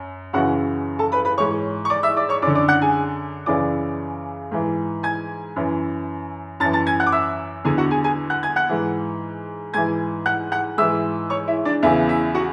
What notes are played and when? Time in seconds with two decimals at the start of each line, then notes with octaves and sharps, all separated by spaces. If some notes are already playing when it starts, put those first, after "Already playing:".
Already playing: F#2
0.33 F#2 C#3 E3 F#4 F#5
0.99 A4 A5
1.12 B4 B5
1.25 B4 B5
1.38 G#2 E3 C#5 C#6
1.85 C#6
1.90 D5 D6
2.03 E5 E6
2.17 D5 D6
2.29 C#5 C#6
2.42 F#2 D5 D6
2.47 D3
2.55 D5 D6
2.68 F#5 F#6
2.82 G#4 G#5
3.46 F#2 C#3 E3 D5 D6
4.51 G#2 E3
5.03 G#5 G#6
5.56 F#2 E3
6.60 F#2 A5 A6
6.65 E3
6.73 A5 A6
6.87 G#5 G#6
7.00 F#5 F#6
7.06 D6
7.12 E5 E6
7.65 E2 D3 G#4 G#5
7.78 F#4 F#5
7.91 G#4 G#5
8.04 G#4 G#5
8.30 F#5 F#6
8.43 G#5 G#6
8.56 F#5 F#6
8.69 G#2 E3
9.73 G#2 E3 G#5 G#6
10.26 F#5 F#6
10.52 F#5 F#6
10.78 G#2 E3 E5 E6
11.30 C#5 C#6
11.48 E4 E5
11.65 D4 D5
11.82 E2 C#3 E3 E4 E5
12.08 E4 E5
12.35 F#4 F#5